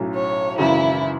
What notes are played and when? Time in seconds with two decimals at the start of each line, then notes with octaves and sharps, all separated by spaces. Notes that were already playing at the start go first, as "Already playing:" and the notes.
Already playing: B1 A2 F#3 C#4
0.15 C#5
0.58 G#1 F#2 C#3 E3 E4